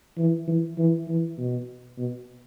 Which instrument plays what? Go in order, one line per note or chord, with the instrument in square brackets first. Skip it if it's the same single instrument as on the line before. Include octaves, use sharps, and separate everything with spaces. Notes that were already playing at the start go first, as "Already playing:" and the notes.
[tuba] E3
E3
E3
E3
B2
B2